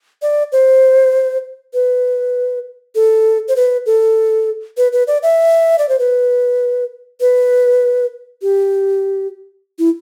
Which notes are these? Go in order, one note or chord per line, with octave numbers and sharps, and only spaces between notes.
D5
C5
B4
A4
C5
B4
A4
B4
B4
D5
E5
D5
C5
B4
B4
G4
E4